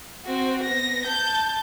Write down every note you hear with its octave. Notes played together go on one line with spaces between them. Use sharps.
C4 F#4
B3 A#6
A5 G6